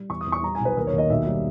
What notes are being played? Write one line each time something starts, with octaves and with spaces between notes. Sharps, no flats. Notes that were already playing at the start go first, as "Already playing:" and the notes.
Already playing: G3
E2 C#6
D#6
E2
C#6
G3 A#5
B1 G#5
B4
D#2 A#4
C#5
D#2
D#5
B1 E5
G3